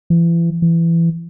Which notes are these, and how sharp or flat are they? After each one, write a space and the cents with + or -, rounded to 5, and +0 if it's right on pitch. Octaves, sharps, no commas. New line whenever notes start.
E3 +35
E3 +20